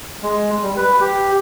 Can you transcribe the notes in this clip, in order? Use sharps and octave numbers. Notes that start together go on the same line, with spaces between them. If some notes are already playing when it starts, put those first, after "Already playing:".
G#3
G3
B4
G4